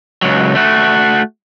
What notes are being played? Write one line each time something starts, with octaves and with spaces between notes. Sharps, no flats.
C#2 F#3
A3 F#4